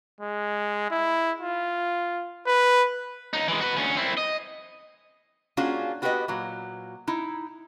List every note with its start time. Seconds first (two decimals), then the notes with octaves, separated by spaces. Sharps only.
0.21 G#3
0.91 E4
1.41 F4
2.47 B4
3.33 C#2 D#4
3.48 E3 G#3
3.61 F#4 B4
3.77 D2 C#4
3.96 C4 E4
4.17 D#5
5.57 A#3 C#4 D4 F4 F#4 G#4
6.02 B3 F#4 G4 A#4 B4 D#5
6.28 A#2 F#3
7.08 D#4 E4